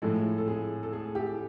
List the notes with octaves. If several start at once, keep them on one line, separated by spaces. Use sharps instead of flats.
A2 F3 G#3 A4
A4
G#4
A4
G#4
G4